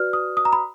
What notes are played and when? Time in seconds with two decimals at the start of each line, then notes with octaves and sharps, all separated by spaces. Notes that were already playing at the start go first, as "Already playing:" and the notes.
Already playing: F#4 B4 D5 F6
0.13 D#6
0.37 D#6
0.45 A#5
0.53 B5